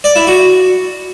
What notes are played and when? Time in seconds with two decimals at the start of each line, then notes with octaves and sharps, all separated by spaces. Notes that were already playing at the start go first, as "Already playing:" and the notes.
0.04 D5
0.16 E4
0.27 F#4